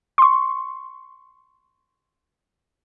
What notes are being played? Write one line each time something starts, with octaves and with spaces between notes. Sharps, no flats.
C6 C#6